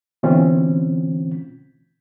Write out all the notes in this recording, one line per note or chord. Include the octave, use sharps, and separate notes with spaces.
B2 D3 E3 C4 C#4 F4